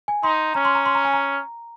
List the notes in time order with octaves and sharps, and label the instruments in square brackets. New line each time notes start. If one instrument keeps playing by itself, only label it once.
[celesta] G#5
[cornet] D#4 [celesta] C6
[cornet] C#4 [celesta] A#5
[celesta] C6
A#5
C6
A#5
G#5
A#5